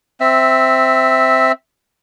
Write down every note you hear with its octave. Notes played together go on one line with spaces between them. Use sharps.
C4 E5